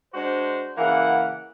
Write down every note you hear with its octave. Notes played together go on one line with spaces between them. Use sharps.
G#3 D4 F#4 C5
C#3 E3 A#3 F#5